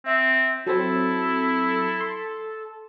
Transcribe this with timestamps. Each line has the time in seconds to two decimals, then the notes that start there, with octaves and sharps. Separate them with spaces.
0.06 C4 E5
0.66 F#3 C4 E4 A4
2.01 C6